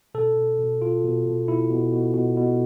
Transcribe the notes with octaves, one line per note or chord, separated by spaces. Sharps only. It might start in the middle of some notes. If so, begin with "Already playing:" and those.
B2 A4
B2
B2
B2 F4
B2
B2
B2 E4
B2
B2
B2
B2